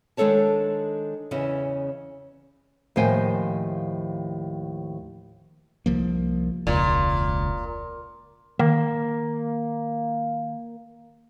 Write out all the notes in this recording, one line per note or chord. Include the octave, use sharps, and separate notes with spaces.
D#3 G#3 D4 A4 C#5 A5
E2 C#3 C#4 E4 D#5
D#2 A2 F3 C5 G5 G#5
C2 F3 A#3
E1 C#2 A#2
D#3 A#3